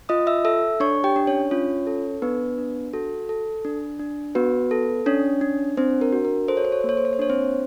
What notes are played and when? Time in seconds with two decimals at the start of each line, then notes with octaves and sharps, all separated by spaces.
0.09 F4 D#5 D#6
0.27 E5 E6
0.45 A4 E5 E6
0.80 D4 C#5 C#6
1.04 G4 G5
1.16 D4
1.27 C#4 C#5
1.51 C#4 F4 C#5
1.87 A4
2.22 B3 D4 B4
2.58 D4
2.93 F#4 A4
3.29 A4
3.65 D4
3.99 D4
4.35 B3 F#4 B4
4.71 A4
5.06 C#4 D4 C#5
5.41 D4
5.77 C4 D4 C5
6.01 A#4
6.13 F#4
6.25 A#4
6.48 A4 C5
6.57 C#5
6.65 C5
6.72 C#5
6.81 A#3 C5
6.89 C#5
6.97 C5
7.05 C#5
7.13 C5
7.19 D4 C#5
7.29 C4 C5